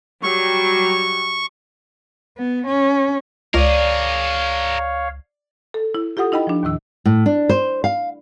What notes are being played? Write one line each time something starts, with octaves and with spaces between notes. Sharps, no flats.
F#3 G3 G4 C#6
B3
C#4
C#2 G#4 A#4 C#5 D5 F5
A4
E4
F4 G4 A4 F#5 D#6
D#4 E4 D#5 G5 B5
F3 D4
D#2 A2 D#3 E6
A2
D4
C5
F5